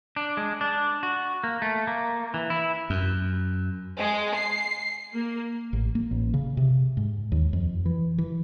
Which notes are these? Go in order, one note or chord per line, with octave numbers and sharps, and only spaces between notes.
D4
G#3
D4
F#4
A#3
A3
A#3
E3
E4
F#2
G#3
C7
A#3
A1
A#3
A1
C#3
C3
G#2
D#2
F2
E3
E3